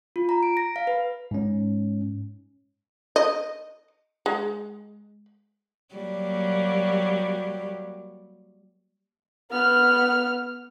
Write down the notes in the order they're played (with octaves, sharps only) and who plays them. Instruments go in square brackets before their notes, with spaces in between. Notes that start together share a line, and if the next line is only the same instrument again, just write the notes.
[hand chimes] F4
A#5
D7
A#6
F5
B4
[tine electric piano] G#2 C#4
[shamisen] D#5
G#3
[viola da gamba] F#3 G3 A#3
[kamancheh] B3 F6